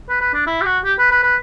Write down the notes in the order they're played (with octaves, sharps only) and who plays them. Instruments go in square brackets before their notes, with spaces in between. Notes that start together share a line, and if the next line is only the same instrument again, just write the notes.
[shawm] B4
B4
D4
E4
G4
F#4
G4
B4
B4
B4